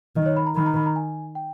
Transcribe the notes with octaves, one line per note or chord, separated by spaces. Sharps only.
D#3 D#5
C#5
B5
A#5
D#3 B5
A#5
B5
A#5
G#5
G5